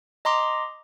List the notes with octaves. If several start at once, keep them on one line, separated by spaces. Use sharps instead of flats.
D#5 A#5 C6 D6